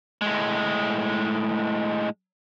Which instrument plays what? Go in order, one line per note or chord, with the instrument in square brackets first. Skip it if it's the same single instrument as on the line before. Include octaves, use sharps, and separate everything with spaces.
[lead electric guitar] A2 G#3